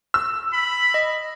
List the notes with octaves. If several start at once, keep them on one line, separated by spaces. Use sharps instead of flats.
E6
B5
D#5